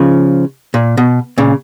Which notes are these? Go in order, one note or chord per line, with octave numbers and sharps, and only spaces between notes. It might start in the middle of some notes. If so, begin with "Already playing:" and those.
Already playing: C#3 F3
A#2
B2
A#2 C#3